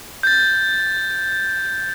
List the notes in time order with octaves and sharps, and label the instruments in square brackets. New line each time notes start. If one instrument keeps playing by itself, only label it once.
[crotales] G6 A6